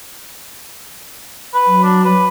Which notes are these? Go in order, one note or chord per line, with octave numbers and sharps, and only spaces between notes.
B4
F#3
D4
B4